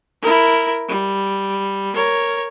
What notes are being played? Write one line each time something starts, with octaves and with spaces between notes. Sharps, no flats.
E4 A#4
G3
A#4 C#5